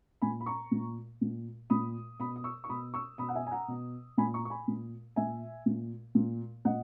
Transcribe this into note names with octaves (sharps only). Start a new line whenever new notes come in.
A#2 G#5 B5
B5
A#5 C#6
A#2
A#2
A#2 B5 D#6
B2 B5 D#6
D#6
C#6 E6
C#6
B2 B5 D#6
C#6 E6
B2 B5 D#6
F#5
E5 G#5
G#5
F#5 A#5
B2
A#2 G#5 B5
A#5 C#6
C#6
G#5 B5
A#2
A#2 E5 G#5
A#2
A#2
A#2 D#5 F#5